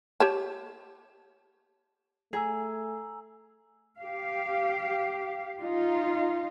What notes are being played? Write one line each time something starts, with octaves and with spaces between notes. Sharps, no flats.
G4 C#5 A5
A3 G#4 G#5 A#5 E6
G4 F5
D#4 F4